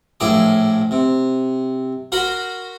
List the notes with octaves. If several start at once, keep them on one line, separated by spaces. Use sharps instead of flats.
A#1 A2 E4 G#4 D6
C3
F#4 A#4 B5 C6